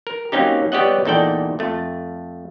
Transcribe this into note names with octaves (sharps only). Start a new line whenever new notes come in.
A#4
F#3 A#3 C4 C#4 D#4 G4
G3 B3 G4 C#5 D#5 F#5
E2 A#2 D#4 A4 D5 G5
F2 A3